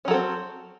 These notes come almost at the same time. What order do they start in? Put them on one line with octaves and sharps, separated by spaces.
C#4 F#3 A4 C4